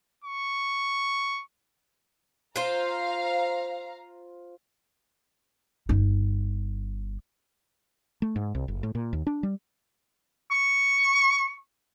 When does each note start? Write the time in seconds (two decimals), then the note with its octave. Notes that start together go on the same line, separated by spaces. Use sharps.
0.24 C#6
2.56 F4 C5 F5 A#5
5.89 G1 D#4
8.22 A3
8.36 G#2
8.55 C2
8.68 F#1
8.83 A2
8.95 A#2
9.13 D#2
9.27 D4
9.43 G3
10.51 C#6